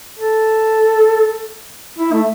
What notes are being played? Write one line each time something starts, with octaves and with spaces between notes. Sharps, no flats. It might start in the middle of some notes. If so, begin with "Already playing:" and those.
A4
E4
A3